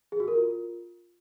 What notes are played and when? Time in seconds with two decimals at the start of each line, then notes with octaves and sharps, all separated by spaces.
0.12 G#4
0.20 F#4
0.28 A#4
0.36 F4